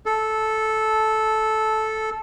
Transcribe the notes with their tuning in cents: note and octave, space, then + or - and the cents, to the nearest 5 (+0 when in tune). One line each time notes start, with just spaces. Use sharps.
A4 -10